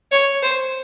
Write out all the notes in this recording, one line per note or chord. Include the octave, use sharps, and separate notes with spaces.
C#5
C5